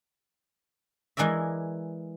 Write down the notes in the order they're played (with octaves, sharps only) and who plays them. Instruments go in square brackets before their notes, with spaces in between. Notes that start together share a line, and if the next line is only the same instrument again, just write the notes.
[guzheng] E3 G#3 A#4 D5 E5